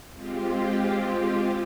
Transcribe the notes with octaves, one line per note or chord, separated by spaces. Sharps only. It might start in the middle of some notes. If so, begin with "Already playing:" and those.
G#3 C4 F4 G4